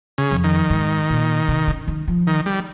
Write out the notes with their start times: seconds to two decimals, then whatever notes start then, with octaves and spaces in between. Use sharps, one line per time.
0.18 C#3
0.31 F2
0.44 D#3
0.70 G#2
1.10 A#2
1.48 C3
1.67 C#3
1.88 D#3
2.08 F3
2.27 D#3
2.46 G3